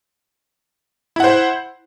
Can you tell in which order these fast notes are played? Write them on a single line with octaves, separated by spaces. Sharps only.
E4 F#5 C5